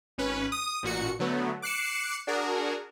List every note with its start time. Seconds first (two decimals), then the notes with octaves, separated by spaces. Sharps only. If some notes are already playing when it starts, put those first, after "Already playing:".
0.18 G#1 C#4 B4
0.52 D#6
0.83 A1 A#2 F#4 C#7
1.19 D3 F#3 A3 B3
1.62 D6 F#6 C7 C#7 E7
2.27 D4 F#4 G#4 A#4